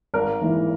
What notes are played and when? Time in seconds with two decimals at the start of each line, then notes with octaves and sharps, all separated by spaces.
0.14 G#1 A#4
0.41 G#2 E3 A#3 E4